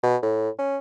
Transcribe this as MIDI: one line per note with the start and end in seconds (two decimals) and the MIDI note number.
0.03 0.16 47
0.22 0.49 45
0.59 0.78 61